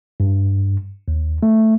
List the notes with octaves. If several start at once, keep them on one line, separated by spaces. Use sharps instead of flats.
G2
D#2
A3